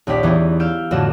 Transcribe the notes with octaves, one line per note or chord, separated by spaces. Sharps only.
A#1 D#2 C#4 G4 D5 B6
E2 E3 B3 D#4 E4
F5 E6 G6 D7
A1 F2 D3 F#4 E7